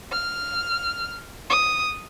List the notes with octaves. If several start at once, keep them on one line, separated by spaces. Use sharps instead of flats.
F6
D#6